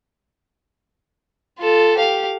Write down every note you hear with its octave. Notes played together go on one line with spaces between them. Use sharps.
F4 A4
G4 F5